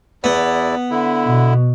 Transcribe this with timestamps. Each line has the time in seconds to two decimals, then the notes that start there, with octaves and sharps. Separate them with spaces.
0.24 E2 B3 E4 D5
0.91 D3 E4
1.24 B2